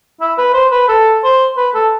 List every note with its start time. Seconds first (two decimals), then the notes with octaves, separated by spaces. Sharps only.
0.21 E4
0.38 B4
0.54 C5
0.72 B4
0.89 A4
1.24 C5
1.57 B4
1.74 A4